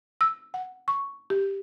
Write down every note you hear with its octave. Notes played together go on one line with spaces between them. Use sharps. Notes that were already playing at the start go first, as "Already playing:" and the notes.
E6
F#5
C#6
G4